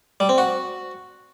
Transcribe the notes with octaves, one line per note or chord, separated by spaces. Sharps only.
G3
C4
F#4